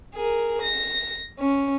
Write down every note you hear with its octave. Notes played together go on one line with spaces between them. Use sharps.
G#4 A#4
A#6
C#4